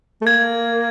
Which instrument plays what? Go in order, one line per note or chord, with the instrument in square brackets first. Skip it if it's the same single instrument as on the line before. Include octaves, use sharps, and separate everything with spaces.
[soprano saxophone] A3
[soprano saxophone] A#3 [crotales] G#6